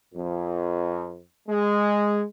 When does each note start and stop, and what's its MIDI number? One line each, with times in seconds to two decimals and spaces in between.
0.14 1.22 41
1.49 2.23 56